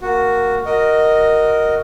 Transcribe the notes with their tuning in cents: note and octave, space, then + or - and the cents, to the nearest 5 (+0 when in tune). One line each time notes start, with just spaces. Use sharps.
A#3 +0 F#4 +0
F#4 +0 A#4 +0 D#5 +0